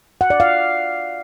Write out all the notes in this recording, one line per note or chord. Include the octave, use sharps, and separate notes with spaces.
F#5
D5
F5